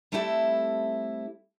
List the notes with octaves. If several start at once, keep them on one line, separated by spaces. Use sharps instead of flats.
G3 A3 C4 E4 G4 A4